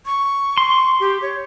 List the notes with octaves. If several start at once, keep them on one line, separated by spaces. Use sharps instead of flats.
C#6
C6
G4
C#5